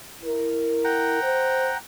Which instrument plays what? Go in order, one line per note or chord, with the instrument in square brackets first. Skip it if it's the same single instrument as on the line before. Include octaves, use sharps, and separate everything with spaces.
[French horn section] E4 A#4
[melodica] F#5 G5 A#5
[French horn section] C5